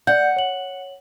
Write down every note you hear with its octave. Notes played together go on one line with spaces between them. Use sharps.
D5 F#5 G6
C#5 F#7